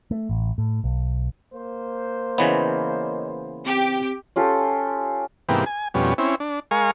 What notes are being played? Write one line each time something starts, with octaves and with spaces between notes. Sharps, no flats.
A3
A1
A2
B1
A#3 C5
C#3 E3 B3 C#5 D#5
C4 G4
C#4 F4 G4 A4
G#2 C3 E3 A#3 B3 G4
G#5
F2 B2 G3 C#4
C4 C#4 E4
D4
G#3 A#4 F5 G#5 C#6